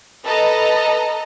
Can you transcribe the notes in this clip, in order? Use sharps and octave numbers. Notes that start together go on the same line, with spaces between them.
A4 B4 D#5 A5 A#5